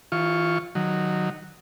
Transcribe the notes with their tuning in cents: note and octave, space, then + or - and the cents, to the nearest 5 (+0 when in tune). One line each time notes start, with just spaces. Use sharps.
E3 -30 F4 +0 C#6 +0
D#3 -10 F#3 +0